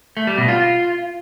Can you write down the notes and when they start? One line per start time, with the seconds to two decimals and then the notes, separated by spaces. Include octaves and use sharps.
0.17 A3
0.27 G3
0.38 B2
0.48 F4